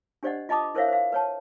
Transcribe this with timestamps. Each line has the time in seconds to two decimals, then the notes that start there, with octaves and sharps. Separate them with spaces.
0.23 D4 G4 C5 D5 D#5 F#5
0.49 F4 D#5 A5 B5 D6 D#6
0.75 E4 A#4 C5 C#5 E5 F5
0.89 C5 F5
1.12 B4 C#5 A5